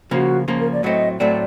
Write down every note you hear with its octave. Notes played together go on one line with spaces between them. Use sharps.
C#3 F3 A#3 F#4
C#3 F3 A#3
A#4
D5
A2 F#3 A3 C4 D#5
A2 F#3 A3 C4 D5